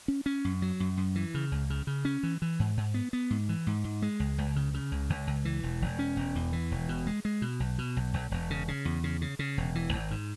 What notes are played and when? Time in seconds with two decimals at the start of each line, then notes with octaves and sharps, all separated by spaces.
0.08 C#4
0.26 C#4
0.45 F#2
0.62 F#3
0.80 F#2
0.97 F#2
1.16 E3
1.34 C#3
1.52 C#2
1.70 C#3
1.87 C#3
2.05 C#4
2.23 E3
2.42 E3
2.60 G#2
2.77 G#2
2.94 B3
3.13 B3
3.30 G#2
3.49 E3
3.67 G#2
3.84 G#2
4.02 G#3
4.20 C#2
4.38 C#2
4.56 C#3
4.74 C#3
4.92 C#2
5.10 C#2
5.27 C#2
5.45 E3
5.63 E1
5.82 E1
5.99 C#4
6.16 E1
6.35 E2
6.53 E3
6.71 E1
6.89 B2
7.07 G#3
7.25 G#3
7.42 B2
7.60 B1
7.78 B2
7.97 B1
8.14 B1
8.31 E1
8.50 C#3
8.68 C#3
8.85 E2
9.04 C#3
9.21 C#3
9.39 C#3
9.58 E1
9.75 E3
9.93 G#1
10.11 G#2